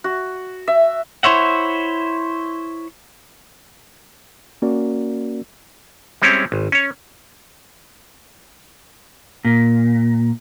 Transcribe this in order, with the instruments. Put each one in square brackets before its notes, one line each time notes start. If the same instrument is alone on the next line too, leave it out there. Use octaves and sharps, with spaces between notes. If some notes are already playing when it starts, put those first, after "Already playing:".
[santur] F#4
E5
[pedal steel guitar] E4 C5 C#5 E5 F#5
[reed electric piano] A#3 C#4 F#4 A#4 D5
[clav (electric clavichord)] G3 G#3 C4 C#4 E4 C#5
G#1
C#4 C#5
[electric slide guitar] A#2